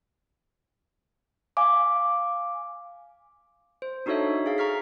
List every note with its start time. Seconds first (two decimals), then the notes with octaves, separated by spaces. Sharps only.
1.57 F5 G#5 D6
3.82 C5
4.06 D4 D#4 F#4 A4 C#5 E5
4.46 G#4 F5
4.58 A#5 C#6 F6 B6